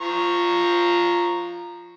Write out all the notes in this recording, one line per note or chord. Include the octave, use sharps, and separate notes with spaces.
F3 A#5 C#6